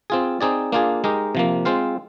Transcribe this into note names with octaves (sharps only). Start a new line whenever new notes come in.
C4 F4 G#4
C4 D#4 G#4 D5
A#3 D4 F4 G#4
G#3 D#4 G4 A#4
C3 F3 A#3
G#3 C4 F4 C5 F5